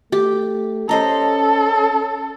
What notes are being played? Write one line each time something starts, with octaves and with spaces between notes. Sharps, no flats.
A3 G4
C#4 A4 C5 D#5 A#5